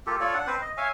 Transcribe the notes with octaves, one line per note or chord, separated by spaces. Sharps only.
A#3 F4 G4 A4
F4 A4 C#5 D5
D4 F#5
C4 B4 C5
D#5
C#5 E5 F5 G#5